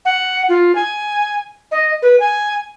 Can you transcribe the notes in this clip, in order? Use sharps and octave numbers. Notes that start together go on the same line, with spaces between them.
F#5
F4
G#5
D#5
B4
G#5